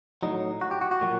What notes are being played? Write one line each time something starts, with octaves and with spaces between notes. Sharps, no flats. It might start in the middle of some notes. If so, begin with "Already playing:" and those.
A2 F#3 D#4
F#4
G4
F#4
F#4
A#2 F#3